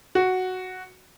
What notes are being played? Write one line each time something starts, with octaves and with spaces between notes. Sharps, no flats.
F#4